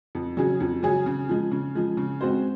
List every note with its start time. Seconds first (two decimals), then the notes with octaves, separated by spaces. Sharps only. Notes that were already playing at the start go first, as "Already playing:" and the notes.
0.15 F2
0.37 C#3 F#3 C#4 G#4
0.60 F2
0.83 C#3 F#3 C#4 G#4
1.06 C#3
1.29 F3 G#3
1.52 C#3
1.75 F3 G#3
1.97 C#3
2.21 G#3 C4 F#4 C5